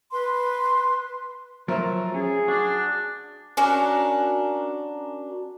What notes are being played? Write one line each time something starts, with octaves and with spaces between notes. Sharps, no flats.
B4 C6
F3 F#3 A3 A#4
C#4 G#4
D4 F#4
C#4 D4 F#4 A#4